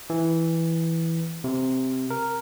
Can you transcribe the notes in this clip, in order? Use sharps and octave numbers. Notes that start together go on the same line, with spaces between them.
E3
C3
A#4